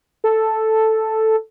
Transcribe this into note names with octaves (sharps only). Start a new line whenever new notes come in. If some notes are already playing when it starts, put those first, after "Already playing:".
A4